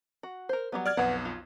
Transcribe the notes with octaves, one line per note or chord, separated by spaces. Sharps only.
F#4
A#4 C5
F#3 G3 B3
D5 F6 G#6
B1 F2 B3 B4 F#5
F4